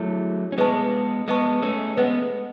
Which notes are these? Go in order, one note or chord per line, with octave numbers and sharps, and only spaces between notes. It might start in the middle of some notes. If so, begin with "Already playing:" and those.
Already playing: F#3 A3 E4 G#4 C#5
C#4
G#3 B3 G#4 B4 D#5 A5 C#6
G#3 B3 G#4 B4 D#5 A5 C#6
A3 C#4
G#3 B3 B4 D#5 F#5